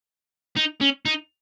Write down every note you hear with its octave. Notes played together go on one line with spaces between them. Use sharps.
D#4
C#4
D#4